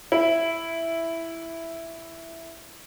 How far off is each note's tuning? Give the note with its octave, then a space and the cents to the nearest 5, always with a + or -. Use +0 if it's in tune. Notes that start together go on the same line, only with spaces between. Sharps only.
E4 +5